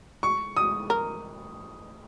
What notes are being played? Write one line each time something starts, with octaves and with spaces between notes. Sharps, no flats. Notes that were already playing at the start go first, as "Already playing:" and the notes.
C#6
D#6
A#4